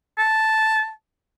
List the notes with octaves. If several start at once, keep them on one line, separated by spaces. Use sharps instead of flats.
A5